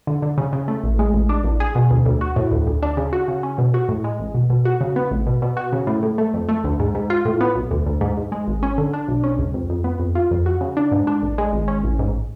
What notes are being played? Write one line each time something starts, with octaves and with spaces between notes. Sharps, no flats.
D3
D3
C#3
C#3
A3
A1
G#3
A1
D4
A1
G#4
B2
D2
D2
F#4
A2
D2
D2
D4
C#3
F#4
C#3
C#4
B2
F#4
A2
G#3
A1
B2
B2
F#4
C#3
B3
A1
B2
B2
F#4
C#3
A2
A2
A3
F2
A3
D2
G#2
G#2
F4
A2
B3
B1
D2
D2
G#2
G#2
G#3
G#1
C#4
D3
D4
B1
C#4
C#2
F2
F2
B3
F2
F4
F2
F#4
C#3
D4
G#2
D4
A1
G#3
G#1
C#4
A1
G#2